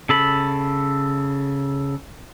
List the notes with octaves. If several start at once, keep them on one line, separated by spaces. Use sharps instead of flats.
C#3 A4 B5